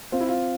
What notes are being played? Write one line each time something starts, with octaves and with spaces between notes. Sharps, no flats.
C4 F4
E4
F4